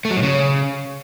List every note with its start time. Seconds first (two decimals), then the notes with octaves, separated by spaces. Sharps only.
0.05 A3
0.11 F#3
0.17 A2
0.23 C#3